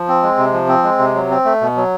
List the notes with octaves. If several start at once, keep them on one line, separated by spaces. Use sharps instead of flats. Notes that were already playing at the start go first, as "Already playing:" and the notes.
Already playing: F3
C4
G#3
C3
F3
C4
G#3
C3
F#3
C4
A3
B2
F#3